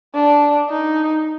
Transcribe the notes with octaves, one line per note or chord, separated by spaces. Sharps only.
D4
D#4